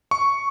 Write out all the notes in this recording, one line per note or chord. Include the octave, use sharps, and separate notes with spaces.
C#6